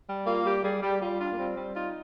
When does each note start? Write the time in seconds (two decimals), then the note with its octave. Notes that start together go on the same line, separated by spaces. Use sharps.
0.08 G3
0.27 A#3 F4
0.45 G3 G4
0.64 G3 G#4
0.82 G3 G4
1.01 G3 F4
1.20 D4 F4
1.32 A#3
1.38 G3 C4
1.57 G3
1.75 D#4 F4